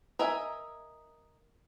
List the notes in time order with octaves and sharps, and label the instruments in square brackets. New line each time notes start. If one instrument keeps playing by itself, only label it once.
[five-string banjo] A#4 D#5 E5 G#5